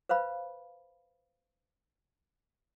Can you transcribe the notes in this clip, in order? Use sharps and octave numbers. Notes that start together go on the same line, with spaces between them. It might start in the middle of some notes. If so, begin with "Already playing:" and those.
B4 C5 F5 B5